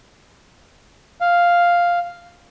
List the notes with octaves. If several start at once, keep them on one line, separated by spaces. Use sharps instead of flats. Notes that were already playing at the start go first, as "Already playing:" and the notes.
F5